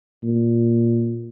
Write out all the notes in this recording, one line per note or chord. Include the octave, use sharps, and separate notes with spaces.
A#2